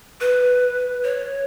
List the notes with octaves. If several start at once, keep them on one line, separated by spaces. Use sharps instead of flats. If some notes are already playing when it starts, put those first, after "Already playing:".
B4
C#5